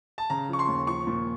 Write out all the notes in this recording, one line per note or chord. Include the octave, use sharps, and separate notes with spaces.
A5
C#3 A#5
F3 C#6
C6
D#2
F3 C#6
A#2